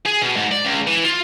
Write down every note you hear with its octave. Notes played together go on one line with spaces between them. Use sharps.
G#4
B2
G#2
D5
C#2
E3
F4